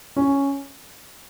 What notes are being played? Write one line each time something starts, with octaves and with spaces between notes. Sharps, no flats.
C#4